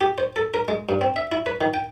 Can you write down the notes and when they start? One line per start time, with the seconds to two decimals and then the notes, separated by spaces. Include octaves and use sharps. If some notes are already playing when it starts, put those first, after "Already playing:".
0.01 G4
0.18 C5
0.36 A4
0.54 A#4
0.68 G#3
0.89 G2
1.01 C4
1.16 E5
1.32 E4
1.46 B4
1.61 D#3
1.74 G5